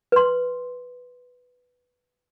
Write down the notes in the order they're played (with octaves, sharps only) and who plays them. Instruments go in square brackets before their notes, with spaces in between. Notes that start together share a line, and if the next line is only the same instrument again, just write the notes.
[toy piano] B4 C6